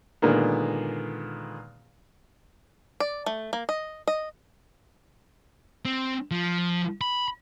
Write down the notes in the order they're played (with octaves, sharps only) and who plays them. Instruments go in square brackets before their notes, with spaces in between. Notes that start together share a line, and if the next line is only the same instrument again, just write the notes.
[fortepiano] A#2 D3 D#3 G#3 A#3 B3
[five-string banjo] D5
A3
A#3
D#5
D#5
[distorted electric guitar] C4
F3
B5